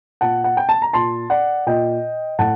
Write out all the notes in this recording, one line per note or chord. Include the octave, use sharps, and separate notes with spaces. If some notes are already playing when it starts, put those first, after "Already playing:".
A#2 F#5 A5
F#5
G5
A5
A#5
A#2 A5 C6
D5 F#5
A#2 D#5 G5
A2 F#5 A5